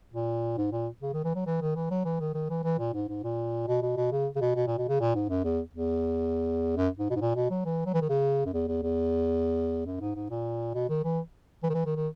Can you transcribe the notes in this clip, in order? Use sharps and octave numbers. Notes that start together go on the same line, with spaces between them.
A#2
G#2
A#2
C#3
D#3
E3
F#3
E3
D#3
E3
F#3
E3
D#3
D#3
E3
E3
A#2
G#2
G#2
A#2
B2
B2
B2
C#3
C#3
B2
B2
A#2
B2
C#3
A#2
G#2
F#2
E2
E2
F#2
G#2
B2
G#2
A#2
B2
F#3
E3
F#3
E3
D#3
C#3
F#2
E2
E2
E2
F#2
G#2
G#2
A#2
B2
D#3
E3
E3
D#3
E3
D#3
D#3